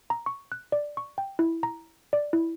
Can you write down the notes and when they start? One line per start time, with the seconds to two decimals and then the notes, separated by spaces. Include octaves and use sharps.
0.10 A#5
0.26 C#6
0.52 F#6
0.72 D5
0.97 C#6
1.18 G5
1.39 E4
1.63 A#5
2.13 D5
2.33 E4